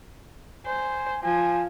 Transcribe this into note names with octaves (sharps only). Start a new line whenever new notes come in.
C5 G#5
F3 G#5